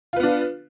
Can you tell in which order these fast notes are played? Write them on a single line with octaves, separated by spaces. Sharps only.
F4 B4 B3 D4